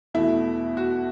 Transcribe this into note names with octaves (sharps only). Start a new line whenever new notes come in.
E2 B2 A3 E4
F#4